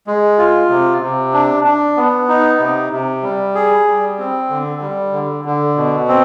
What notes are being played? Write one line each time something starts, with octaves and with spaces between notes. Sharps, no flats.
G#3
F4
C3
C3
D4
D4
B3
D#4
C3
C3
G3
G#4
G3
C4
D3
G3
D3
D3
B2
C4